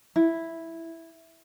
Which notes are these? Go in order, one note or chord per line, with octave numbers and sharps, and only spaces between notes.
E4